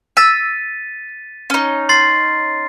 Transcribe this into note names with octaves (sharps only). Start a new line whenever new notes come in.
E6 A6 B6 D#7
C#4 D#4
C6 A6 C7